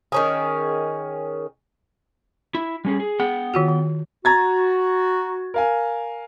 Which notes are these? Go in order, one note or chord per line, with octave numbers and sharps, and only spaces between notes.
D#3 C#4 G#4
E4
G3 C#4 G#4
G#4
B3 G#4 F#5 G5
D#3 F4 F#4
D#3
F#4 A#5 G#6 A6
A#4 F5 G#5